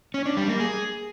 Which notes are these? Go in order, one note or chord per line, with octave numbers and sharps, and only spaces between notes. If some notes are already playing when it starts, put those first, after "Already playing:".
C#4
D4
G3
A#3
G#4